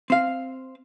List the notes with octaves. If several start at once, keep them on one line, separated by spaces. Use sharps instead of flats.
C4 F5